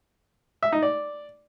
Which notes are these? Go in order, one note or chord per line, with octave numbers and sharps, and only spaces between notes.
E5
D#4
D5